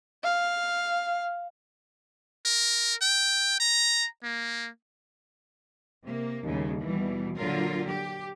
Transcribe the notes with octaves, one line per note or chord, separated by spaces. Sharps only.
F5
A#4
G5
A#5
A#3
C3 A#3
D#2 A2 C#3 G3
B2 E3 G3
A#2 D3 F#3 F4 A#4
G4